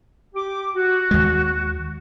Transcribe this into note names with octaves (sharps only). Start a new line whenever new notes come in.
G4 D6
F#4
D#2 G#3